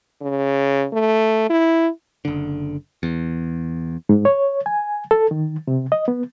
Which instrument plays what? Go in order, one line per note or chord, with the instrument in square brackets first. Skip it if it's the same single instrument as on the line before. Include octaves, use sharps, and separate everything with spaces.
[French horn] C#3
A3
E4
[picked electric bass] F#1 D3
E2
[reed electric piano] G#2
C#5
G#5
A4
D#3
C3
D#5
B3